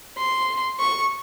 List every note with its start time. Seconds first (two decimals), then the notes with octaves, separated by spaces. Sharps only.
0.17 C6
0.80 C#6